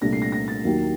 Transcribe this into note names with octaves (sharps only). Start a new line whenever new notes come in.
C2 A#2 A3 D4 A#6
C7
A#6
A#6
A6
D#2 D#3 F#3 A#3